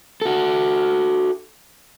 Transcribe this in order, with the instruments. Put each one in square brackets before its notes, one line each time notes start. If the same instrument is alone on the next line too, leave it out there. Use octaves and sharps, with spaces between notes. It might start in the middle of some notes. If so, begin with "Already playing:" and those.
[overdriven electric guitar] F#4 A4